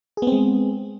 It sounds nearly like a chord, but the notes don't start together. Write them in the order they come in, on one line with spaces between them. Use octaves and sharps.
G#4 B3 C4 G#3